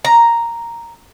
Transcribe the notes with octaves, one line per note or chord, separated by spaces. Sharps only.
A#5